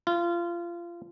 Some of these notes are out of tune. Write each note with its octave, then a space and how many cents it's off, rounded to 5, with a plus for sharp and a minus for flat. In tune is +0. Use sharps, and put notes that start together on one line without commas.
F4 -25